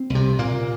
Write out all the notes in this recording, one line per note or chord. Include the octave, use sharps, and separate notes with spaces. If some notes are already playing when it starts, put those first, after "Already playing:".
Already playing: C4
C2 C3
A#2 A#3